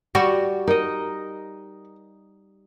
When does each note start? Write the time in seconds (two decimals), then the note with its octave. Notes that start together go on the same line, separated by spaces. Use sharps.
0.15 G3 F#4
0.68 D#4 A#4 D#5